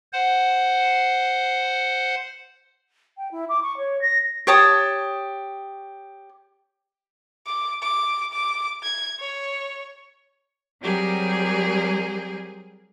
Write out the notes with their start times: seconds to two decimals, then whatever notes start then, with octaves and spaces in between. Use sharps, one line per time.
0.13 C5 F#5
3.17 G5
3.31 E4
3.49 D6
3.63 C#6
3.78 C#5
4.02 A#6
4.47 G4 C#5 A5 D#6
7.47 D6
7.82 D6
8.33 D6
8.83 G#6
9.19 C#5
10.81 F#3 G3 C4 G4 G#4 A#4